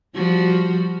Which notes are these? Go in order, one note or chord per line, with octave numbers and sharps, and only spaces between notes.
F3 G3 F#4